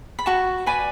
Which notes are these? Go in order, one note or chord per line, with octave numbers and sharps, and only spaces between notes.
B5
F#4 A5 C#6
B4 D5 G#5 B5